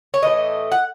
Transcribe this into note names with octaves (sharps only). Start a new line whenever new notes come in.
C#5
A2 E3 A3 D#5
F#5